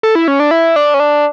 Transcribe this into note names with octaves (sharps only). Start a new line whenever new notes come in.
A4
E4
C#4
D4
E4
D4
C#4
D4